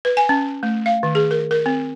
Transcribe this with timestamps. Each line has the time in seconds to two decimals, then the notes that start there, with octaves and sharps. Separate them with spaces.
0.05 B4
0.17 G#5
0.29 C#4
0.63 A3
0.86 F5
1.03 D#3
1.15 G#4
1.31 A#4
1.51 A#4
1.66 C4